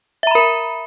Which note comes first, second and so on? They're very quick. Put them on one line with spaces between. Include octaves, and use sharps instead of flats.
E5 A#5 B5 A#4